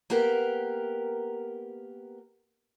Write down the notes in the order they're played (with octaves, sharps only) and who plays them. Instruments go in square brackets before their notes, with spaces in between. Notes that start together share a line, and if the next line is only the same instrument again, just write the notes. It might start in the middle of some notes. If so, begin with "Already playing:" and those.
[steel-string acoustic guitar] A#3 B3 G4 A#4